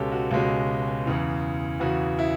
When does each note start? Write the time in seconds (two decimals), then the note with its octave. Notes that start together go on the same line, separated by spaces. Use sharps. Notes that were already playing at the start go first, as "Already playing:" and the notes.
Already playing: C#2 B2 G#3 C#4 G4 A4
0.12 F#4
0.31 C#2 B2 G#3 C#4
1.06 E2 C#3 E3
1.80 E2 C#3 E3 F#4
2.19 E4